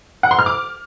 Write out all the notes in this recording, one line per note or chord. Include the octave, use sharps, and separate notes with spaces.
F#5
C6
F6
D6